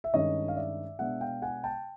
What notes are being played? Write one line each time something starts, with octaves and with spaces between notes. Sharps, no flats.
E5
G2 D#3 G#3 C#4 C#5 D#5
F5
D5 E5
B2 G#3 B3 D4 E5 F#5
F5 G5
F#5 G#5
G5 A5